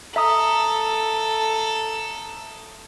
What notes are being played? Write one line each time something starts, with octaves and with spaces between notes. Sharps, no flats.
A4 E5 A#5 D#6